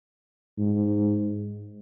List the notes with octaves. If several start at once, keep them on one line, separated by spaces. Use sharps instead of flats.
G#2